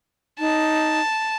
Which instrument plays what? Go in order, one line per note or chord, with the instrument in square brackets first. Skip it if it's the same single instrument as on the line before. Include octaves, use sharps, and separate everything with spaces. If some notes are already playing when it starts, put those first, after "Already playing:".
[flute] D#4 [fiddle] A5